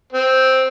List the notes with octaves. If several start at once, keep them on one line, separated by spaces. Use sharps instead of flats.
C4